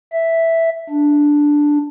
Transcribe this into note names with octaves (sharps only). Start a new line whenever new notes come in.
E5
D4